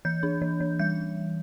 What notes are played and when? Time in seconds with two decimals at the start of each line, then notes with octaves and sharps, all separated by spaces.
0.05 E3 G6
0.23 D4
0.42 E3
0.60 E3
0.79 G3 G6